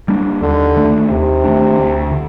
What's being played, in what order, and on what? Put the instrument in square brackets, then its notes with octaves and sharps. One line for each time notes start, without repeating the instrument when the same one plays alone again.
[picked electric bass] G3 A#3 D4
[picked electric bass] D#2 [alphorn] D3
[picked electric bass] D#3 A3 D4
[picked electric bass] D#2 [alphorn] C3
[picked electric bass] D#3 A3 D4
D2
D3